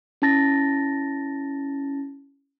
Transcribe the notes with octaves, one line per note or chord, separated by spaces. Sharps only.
C#4 E4 A5 A6 A#6